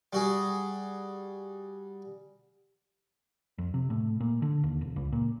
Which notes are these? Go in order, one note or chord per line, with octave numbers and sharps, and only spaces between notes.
G3 F#4 G#4
F2
C3
A2
A#2
D3
D#2
E1
C#2
A#2